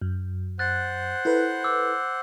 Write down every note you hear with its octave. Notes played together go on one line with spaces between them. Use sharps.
F#2
C5 F#5 F#6 A6
E4 A4 B4
D6 E6